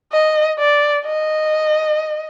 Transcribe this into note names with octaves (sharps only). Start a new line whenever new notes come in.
D#5
D5
D#5